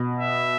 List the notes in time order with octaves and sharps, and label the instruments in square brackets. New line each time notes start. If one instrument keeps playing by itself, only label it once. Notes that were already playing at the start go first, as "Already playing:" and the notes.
Already playing: [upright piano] B2
[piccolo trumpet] E5